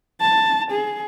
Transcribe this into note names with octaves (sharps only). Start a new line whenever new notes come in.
A5
G#4